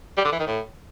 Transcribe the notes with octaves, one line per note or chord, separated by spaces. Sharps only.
G3
D3
E3
D#3
A2